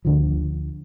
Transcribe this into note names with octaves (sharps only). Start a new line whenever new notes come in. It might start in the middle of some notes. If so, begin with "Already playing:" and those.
D2 D3 F3